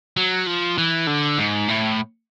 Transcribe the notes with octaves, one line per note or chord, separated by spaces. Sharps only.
F#3
F3
E3
D3
G#2
A2